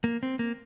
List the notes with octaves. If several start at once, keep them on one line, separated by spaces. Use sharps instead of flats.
A#3
C4
A#3